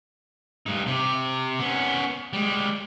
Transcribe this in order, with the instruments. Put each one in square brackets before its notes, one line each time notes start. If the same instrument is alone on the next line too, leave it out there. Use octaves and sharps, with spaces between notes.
[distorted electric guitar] G2 D#4
C3 G4
B3 C#4
G3 G#3